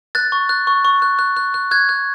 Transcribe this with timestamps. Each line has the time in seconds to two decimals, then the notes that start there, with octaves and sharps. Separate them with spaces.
0.15 F#6 A6
0.32 C#6
0.49 F#6
0.67 C#6
0.85 C#6
1.02 F#6
1.19 F#6
1.37 F#6
1.54 F#6
1.71 F#6 G#6
1.89 F#6